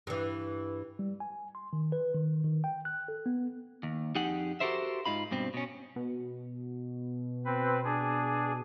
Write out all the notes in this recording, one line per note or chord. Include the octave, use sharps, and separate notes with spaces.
G2 E3
G3
G#5
C6
D#3
B4
D#3
D#3
G5
F#6
A4
B3
D#2
F2 D#4 G4 G#4 F#5
F#4 G4 A4 A#4 C5 E5
G#2 D#4 F4 B5
G2 B2 C4
B2 C#4
B2
C4 B4
D4 G#4